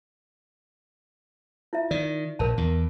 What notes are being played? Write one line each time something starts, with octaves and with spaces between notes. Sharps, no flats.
E4 F4 E5
D#3 D5
A#1 A#4 A5
E2